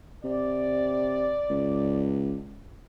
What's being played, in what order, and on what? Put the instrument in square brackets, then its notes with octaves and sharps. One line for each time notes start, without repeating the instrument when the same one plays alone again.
[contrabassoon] C3 [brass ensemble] D5
[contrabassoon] C#2